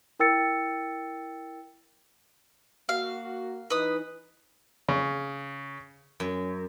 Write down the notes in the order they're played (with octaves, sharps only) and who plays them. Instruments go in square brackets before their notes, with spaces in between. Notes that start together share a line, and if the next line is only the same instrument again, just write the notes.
[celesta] E4 A#4 G5 E6 A6 C#7
[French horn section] A#3 F#4 [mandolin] F5
[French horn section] E3 D#4 [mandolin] B4 D#6
[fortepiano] C#3
[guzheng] F#2